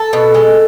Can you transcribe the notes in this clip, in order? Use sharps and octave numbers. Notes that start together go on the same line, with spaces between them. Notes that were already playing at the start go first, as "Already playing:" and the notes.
Already playing: A4
B2
G#3